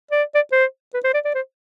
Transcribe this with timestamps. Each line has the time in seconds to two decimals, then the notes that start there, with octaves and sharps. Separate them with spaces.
0.11 D5
0.35 D5
0.52 C5
0.94 B4
1.04 C5
1.14 D5
1.25 D5
1.35 C5